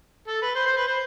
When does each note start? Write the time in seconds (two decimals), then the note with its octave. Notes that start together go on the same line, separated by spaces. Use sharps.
0.28 A4
0.42 B4
0.55 C5
0.66 C5
0.77 B4
0.87 C5